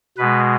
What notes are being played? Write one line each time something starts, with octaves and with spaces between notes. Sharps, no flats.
B2 G#3 B4